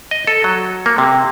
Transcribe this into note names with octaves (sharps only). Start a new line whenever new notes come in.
D#5
A4
F#3
A#3
C3